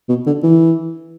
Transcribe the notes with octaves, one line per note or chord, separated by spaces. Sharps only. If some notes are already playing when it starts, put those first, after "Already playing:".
B2
D3
E3